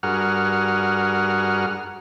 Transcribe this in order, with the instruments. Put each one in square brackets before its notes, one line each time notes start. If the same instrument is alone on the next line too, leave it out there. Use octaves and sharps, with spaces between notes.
[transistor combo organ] G2 F#4 G#4 A#4 F#5 F6